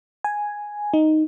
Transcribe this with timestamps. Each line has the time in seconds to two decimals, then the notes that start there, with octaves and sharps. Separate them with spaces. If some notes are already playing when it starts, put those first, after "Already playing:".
0.24 G#5
0.94 D#4